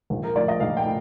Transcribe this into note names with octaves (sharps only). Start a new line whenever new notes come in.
A#1
A#4
A2 F3 D5
D#5
A#1 F5
G5
A2